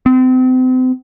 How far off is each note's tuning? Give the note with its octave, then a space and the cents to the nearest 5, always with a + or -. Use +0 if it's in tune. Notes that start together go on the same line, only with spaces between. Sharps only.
C4 -35